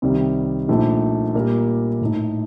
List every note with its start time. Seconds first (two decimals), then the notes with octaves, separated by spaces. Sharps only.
0.02 C2 C3 D#3 G3
0.68 A#1 A#2 A3 D#4
1.34 A#2 G3 A#3
2.01 A2 A3 D#4